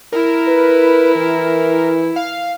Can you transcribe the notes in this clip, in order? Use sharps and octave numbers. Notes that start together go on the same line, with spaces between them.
E4 A#4
B4
E3
F5